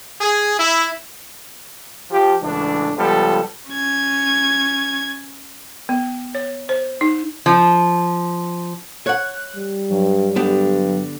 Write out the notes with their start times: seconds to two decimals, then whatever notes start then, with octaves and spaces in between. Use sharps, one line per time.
0.21 G#4
0.60 E4
2.11 F3 G4
2.41 C#2 A2 E3 D4
2.96 C#2 F3 G3 B3 A4
3.69 C#4 G#6
5.89 B3
6.35 C#5
6.69 C5
7.01 D#4
7.46 F3
9.06 C#5 F#5 F#6
9.56 G3
9.91 G2 F#3
10.36 G2 D3 B3 G4